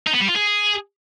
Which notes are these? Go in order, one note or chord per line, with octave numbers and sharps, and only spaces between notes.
D#4
B3
G3
F4
G#4